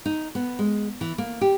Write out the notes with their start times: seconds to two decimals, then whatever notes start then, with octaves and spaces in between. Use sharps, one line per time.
0.06 D#4
0.35 B3
0.59 G#3
1.01 E3
1.18 A#3
1.41 G4